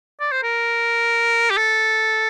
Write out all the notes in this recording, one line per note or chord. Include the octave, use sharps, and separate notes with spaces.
D5
C5
A#4
G4
A4